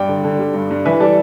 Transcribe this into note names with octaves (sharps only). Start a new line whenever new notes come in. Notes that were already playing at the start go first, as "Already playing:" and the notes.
Already playing: G2 D5 G5
D3
D3
G3
G2
G2
E3 B4 E5
G3 A4 D5